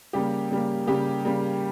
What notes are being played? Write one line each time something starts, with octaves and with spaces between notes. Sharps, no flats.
C#3 G3 A#3 G4
C#3 G3 A#3
C#3 G3 A#3 G4
C#3 G3 A#3